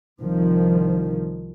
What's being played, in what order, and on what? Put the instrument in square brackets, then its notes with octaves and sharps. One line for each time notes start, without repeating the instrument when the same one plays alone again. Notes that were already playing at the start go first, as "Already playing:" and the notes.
[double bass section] C2 D#3 F3